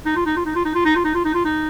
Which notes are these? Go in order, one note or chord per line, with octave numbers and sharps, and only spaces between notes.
D#4
F4
D#4
F4
D#4
F4
D#4
F4
D#4
F4
D#4
F4
D#4
F4
D#4